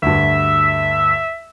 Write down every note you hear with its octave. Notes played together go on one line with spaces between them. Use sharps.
D2 G2 E5